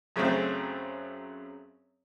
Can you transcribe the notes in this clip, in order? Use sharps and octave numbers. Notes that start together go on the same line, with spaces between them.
F#2 C#3 F#3 A3 C4